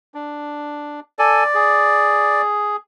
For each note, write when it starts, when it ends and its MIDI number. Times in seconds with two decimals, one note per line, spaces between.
0.14 1.00 62
1.19 1.44 69
1.19 2.42 74
1.19 1.44 80
1.54 2.76 68